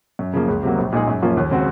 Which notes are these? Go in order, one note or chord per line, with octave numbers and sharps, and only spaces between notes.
F#2
C#3 F3 A#3
C#2
C3 F#3 A#3
A#1
A#2 G#3 D#4 G#4
F#2
F3 A#3 C#4 F4
D#2
C#3 G#3 C4 F#4